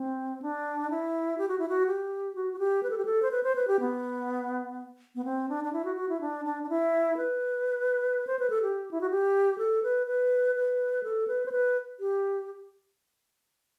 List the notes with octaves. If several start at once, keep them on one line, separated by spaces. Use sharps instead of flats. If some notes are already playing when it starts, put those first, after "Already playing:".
Already playing: C4
D4
E4
G4
F#4
E4
F#4
G4
F#4
F#4
G4
B4
A4
G4
A4
C5
B4
C5
B4
G4
B3
B3
C4
D4
D4
E4
F#4
F#4
E4
D4
D4
D4
E4
B4
C5
B4
A4
G4
E4
F#4
G4
A4
B4
B4
B4
A4
B4
C5
B4
G4